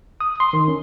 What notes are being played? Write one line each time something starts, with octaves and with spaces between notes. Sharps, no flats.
D#6
C6
D#3
C#4